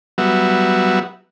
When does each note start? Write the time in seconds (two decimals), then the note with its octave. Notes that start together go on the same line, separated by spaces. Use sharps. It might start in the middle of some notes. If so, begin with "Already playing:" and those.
0.18 F#3 G3 B3 F#4 E5